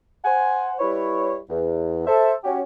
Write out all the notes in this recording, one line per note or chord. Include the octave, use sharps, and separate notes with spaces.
C5 F#5 G#5
G3 E4 B4 C#5
E2
A4 C5 E5
C#4 F#4 G4